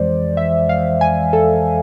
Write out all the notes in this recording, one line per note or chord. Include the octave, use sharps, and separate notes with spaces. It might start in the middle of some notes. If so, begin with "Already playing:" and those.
Already playing: F2 E3 G#3 C5 D5
E5
F5
G#5
A4